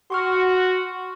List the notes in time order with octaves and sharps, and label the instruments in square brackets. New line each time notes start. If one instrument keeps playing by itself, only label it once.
[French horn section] F#4 [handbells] C6 C#6 F6